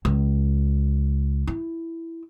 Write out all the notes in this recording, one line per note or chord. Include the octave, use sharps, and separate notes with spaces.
C#2
E4